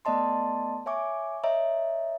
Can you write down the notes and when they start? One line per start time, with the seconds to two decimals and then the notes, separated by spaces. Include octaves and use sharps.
0.05 A3 B3 D5 D#5 A5 C6
0.86 C#5 E5 G#5 C#6 D6
1.44 C#5 D#5 E5 A#5